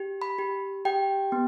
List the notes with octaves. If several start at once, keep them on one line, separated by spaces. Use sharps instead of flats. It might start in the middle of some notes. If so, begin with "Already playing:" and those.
Already playing: G4
B5
G4
G4 G5
B3